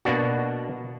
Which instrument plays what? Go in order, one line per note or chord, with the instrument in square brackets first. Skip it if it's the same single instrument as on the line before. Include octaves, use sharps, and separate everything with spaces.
[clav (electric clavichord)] B2 A#3 B3 D4 F#4